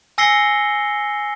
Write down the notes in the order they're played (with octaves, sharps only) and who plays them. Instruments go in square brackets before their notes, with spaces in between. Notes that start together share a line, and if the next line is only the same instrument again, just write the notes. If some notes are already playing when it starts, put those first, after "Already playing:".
[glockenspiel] G#5 E6 A#6 C7 C#7 G7